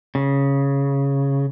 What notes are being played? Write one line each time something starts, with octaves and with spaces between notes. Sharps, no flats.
C#3